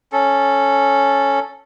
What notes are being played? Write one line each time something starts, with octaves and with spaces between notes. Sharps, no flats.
C#4 A4